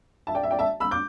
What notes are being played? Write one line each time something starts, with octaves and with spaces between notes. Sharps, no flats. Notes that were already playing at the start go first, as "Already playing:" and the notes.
E5 A5
D5 G5
E5
D5 G5
E5 A5
B5 E6
D6 G6